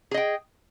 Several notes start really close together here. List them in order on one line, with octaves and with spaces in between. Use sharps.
G#4 D#5 G5